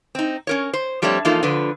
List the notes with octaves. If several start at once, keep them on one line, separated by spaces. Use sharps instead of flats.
C4 D#4
C#4 A#4 C#5
C5
F3 G3 A3 C4 D4 C#5
E3 F3 A#3 D#4 F4 A4
D3 F3 F4 B4